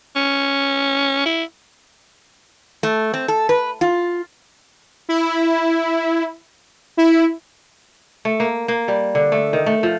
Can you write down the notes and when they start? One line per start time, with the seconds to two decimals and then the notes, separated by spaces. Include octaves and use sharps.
0.16 C#4
1.26 E4
2.83 A3
3.14 C4
3.28 A4
3.49 B4
3.81 F4
5.09 E4
6.97 E4
8.25 A3
8.40 A#3
8.68 A#3
8.88 G3
9.15 D3
9.32 A3
9.53 D#3
9.66 A3
9.83 F3